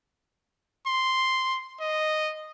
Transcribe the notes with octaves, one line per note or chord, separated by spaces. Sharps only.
C6
D#5